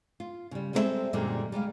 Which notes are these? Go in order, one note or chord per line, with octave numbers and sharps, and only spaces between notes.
F4
C#3 G3
G3 G#3 C4 E4 A4 E5
F#2 A#2 D3 G3 G#3
G3 G#3 G4 F5